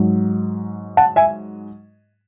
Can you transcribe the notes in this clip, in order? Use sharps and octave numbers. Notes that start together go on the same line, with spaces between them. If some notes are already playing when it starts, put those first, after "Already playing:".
Already playing: G#2 F#3
F#5 A5
E5 G#5